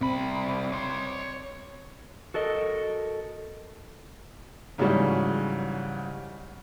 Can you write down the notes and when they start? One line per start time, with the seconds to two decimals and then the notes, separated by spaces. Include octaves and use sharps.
0.01 C2 C4 B5
0.72 C#5 C6
2.34 F#4 A4 A#4 D#5
4.78 G#2 C#3 E3 F#3 G3 C#4